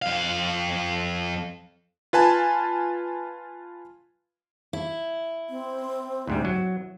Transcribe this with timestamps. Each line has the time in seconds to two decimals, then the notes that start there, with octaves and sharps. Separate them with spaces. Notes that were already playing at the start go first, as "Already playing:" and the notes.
0.02 F2 F5
2.13 F4 B4 G#5 A5
4.73 E4
5.50 C4
6.27 D2 G#2 G3
6.45 F#3